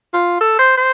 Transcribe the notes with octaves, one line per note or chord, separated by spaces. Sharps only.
F4
A4
C5
C5